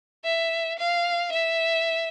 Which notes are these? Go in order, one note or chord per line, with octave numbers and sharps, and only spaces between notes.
E5
F5
E5